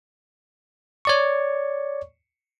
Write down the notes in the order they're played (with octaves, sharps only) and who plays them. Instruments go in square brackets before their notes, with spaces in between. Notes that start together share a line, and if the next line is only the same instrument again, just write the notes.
[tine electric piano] C#5 D5 C#6